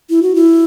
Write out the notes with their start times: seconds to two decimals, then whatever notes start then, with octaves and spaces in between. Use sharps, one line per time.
0.10 E4
0.23 F#4
0.35 E4